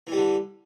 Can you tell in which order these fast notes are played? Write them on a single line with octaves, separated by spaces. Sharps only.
E3 G3 D3